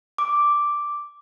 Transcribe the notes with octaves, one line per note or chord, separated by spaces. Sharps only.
D6